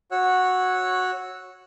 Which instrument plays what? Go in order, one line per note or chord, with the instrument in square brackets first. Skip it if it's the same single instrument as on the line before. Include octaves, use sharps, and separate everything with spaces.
[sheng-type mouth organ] F#4 C#5 F#5 E6 F#6